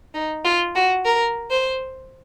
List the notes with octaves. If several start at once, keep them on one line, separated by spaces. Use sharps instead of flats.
D#4
F4
F#4
A#4
C5